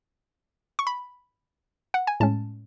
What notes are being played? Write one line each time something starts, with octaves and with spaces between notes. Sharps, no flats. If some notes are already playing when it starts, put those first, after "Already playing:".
C#6
B5
F#5
G#5
A2 G#3 C#4 A5